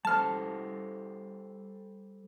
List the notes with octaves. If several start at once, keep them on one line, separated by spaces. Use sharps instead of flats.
G3 A4 C5 A5 F6